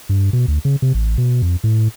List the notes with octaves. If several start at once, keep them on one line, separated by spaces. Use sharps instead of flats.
G2
B2
D2
C#3
C3
A1
B2
F2
A2